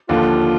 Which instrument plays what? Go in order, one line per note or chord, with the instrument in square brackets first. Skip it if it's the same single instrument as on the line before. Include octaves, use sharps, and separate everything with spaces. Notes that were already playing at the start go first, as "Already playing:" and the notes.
[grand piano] D#2 D3 F3 [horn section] F4